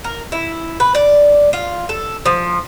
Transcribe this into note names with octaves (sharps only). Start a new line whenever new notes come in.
A#4
E4
B4
D5
F4
A4
F3